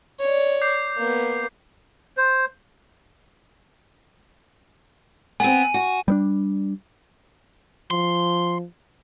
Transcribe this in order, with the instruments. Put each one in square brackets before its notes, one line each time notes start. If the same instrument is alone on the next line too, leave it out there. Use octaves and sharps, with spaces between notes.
[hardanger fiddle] C#5 D5
[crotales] D6 G6 C7
[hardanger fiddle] A#3 B3
[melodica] C5
[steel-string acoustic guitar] B3 C4 [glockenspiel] G#5 D#7
[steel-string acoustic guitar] F#4
[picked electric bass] G3 B3 D4
[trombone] F3 [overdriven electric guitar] C6